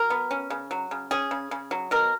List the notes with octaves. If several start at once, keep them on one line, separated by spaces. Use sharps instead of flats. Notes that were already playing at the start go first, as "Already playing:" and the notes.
Already playing: F#3 A#4
B3
C#4
C#3
F#3
C#3
C#4 G#4
C#3
C#3
F#3
B2 A#4